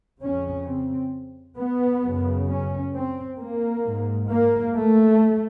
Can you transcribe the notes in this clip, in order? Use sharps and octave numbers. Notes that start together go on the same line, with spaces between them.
F2 C#3 C#4
C4
B3
F#2 C#3
C#4
C4
A#3
G#2
A#3
A3